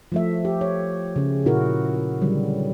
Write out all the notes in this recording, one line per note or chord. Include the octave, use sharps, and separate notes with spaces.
F3 A3 E5
G4
C#5
C#3 C#4
A#2 E4 F#4 G#4 A#4
D3 D#3 F#3 G3